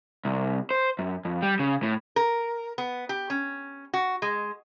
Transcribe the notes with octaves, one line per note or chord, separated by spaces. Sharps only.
C2
C5
F#2
F2
G3
C#3
A2
A#4
B3
G4
C#4
F#4
G#3